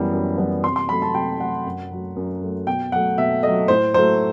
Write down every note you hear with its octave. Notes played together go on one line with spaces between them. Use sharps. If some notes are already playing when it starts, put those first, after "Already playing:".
Already playing: F#2 E3 G3 B3
F#2
E3 G3 B3
C3 C6
C6
F#3 A3 B5
A5
C3 G5
F#3 A3 F#5
F#2
F#3 A3
F#2
F#3 A3
B2 G5
F#3 A3 F#5
B2 E5
F#3 A3 D#5
A2 C5
F#3 A3 C5